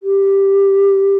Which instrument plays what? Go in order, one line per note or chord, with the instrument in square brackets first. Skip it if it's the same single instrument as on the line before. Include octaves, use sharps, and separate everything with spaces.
[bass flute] G4